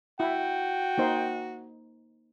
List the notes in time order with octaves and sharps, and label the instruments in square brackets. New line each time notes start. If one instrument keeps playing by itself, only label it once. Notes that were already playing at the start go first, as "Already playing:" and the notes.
[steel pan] E4 [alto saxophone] F#4 [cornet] G5
[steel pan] A#3 D#4 C5